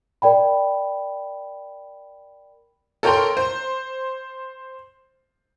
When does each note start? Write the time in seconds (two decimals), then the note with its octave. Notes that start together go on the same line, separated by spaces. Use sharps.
0.22 A#4 D5 G5 B5
3.03 A4 A#4 C#5 G5 A#5 C6
3.37 C5